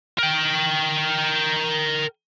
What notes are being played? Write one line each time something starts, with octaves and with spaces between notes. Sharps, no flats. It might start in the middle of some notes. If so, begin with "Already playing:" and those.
A#4 G5